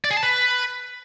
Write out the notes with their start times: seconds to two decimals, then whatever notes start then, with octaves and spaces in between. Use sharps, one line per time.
0.05 D5
0.11 G#4
0.17 A5
0.23 B4